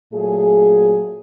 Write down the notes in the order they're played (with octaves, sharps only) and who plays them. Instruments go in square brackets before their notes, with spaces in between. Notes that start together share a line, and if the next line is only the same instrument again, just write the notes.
[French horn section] A#2 F#3 A3 G#4